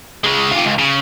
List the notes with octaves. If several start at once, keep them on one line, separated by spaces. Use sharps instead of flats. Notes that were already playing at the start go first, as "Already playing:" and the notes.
C#3 G#3
F4 G4
C#2
C#3